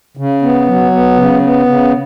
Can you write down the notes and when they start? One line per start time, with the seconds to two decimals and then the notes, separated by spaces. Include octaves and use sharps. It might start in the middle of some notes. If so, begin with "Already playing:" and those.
0.17 C#3
0.42 B3
0.67 F#3
0.92 B3
1.17 C#3
1.42 B3
1.66 C#3